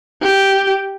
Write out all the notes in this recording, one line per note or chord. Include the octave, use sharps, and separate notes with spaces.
G4